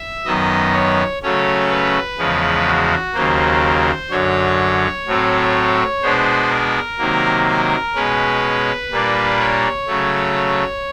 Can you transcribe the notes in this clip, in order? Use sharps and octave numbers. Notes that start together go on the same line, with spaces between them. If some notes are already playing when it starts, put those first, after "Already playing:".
Already playing: E5
F#2 D#3 F#3 B3 D#5
C#5
C#3 F#3 A3 C#4 C#5
B4
E2 C#3 F3 G#3
F#4
D#2 C#3 F#3 A#3 C5
F#2 D3 F#3 C#5
A2 F#3 A3 C4
B2 G#3 B3 D4 C5
A#4
C3 D#3 F#3 A#3
B2 G#3 C#4 B4
A#2 G3 A#3 D4
C#5
C#3 F#3 A3